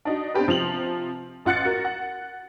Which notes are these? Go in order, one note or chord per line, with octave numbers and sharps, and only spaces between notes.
D4 D#4 F#4
B3 C4 D4 G4 B4
C3 F3 C4 F7 F#7
A1 F4 F#5 F#6 A6 C#7
F#4 A#4
F#5